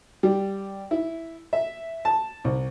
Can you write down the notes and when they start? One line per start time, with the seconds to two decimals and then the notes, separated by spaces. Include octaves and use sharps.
0.23 G3
0.91 E4
1.53 E5
2.05 A5
2.44 C2